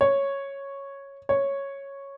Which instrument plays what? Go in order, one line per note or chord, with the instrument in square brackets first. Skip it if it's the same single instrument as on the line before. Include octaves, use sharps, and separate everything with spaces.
[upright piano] C#5
C#5